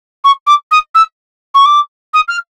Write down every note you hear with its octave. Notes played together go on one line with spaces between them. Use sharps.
C#6
D6
D#6
E6
C#6
D6
D#6
F6